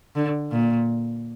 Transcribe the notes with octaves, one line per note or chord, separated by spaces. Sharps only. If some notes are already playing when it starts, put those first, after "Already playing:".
D3
A#2